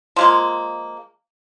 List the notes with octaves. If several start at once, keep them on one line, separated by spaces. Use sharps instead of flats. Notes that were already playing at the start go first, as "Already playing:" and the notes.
F3 G#3 A#3